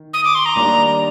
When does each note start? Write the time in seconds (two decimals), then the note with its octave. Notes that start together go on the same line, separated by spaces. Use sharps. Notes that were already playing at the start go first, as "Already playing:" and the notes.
Already playing: D#3
0.14 D#6
0.25 D6
0.35 C6
0.46 A#5
0.55 D#3 G3 A#3 D4